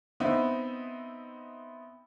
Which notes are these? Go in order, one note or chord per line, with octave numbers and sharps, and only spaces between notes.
B3 C4 D#4 E5